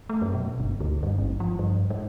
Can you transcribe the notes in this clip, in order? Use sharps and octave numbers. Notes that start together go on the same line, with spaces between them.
A3
F#2
B2
G1
D2
G2
G#1
F3
G2
G#2